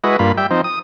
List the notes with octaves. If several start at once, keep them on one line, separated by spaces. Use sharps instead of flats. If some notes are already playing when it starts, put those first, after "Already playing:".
G#3 E4 F#4 B4 D#5
G2 A#3 F4 B5
G3 E5 G5
F3 C4 D#4
D#6